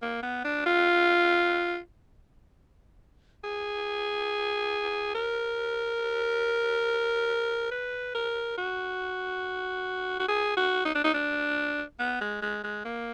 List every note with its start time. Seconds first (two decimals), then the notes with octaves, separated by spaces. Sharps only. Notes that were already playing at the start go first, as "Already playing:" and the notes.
0.02 A#3
0.23 B3
0.44 D4
0.66 F4
3.44 G#4
5.15 A#4
7.71 B4
8.14 A#4
8.57 F#4
10.20 F#4
10.28 G#4
10.57 F#4
10.85 D#4
10.95 D4
11.04 D#4
11.14 D4
11.99 B3
12.21 G#3
12.42 G#3
12.64 G#3
12.85 A#3